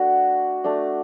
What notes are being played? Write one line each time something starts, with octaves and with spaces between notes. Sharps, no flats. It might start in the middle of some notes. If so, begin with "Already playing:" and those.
Already playing: A3 D4 F#4
A3 D4